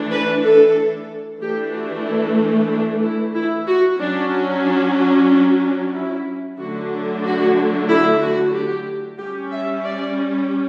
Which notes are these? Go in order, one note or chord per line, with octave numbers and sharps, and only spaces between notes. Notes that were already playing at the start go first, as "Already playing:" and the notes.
Already playing: E3 A3 D4
B4
A4
E3 A3 D4 G4
F#4
E4
D4
E4
E4
F#4
F#3 C#4 D4
D4
D4
D4
D4
E4
D3 F#3 A3 D4 F#4
F#4
E4
F#4
G4
G3 C#4 G4
E5
D5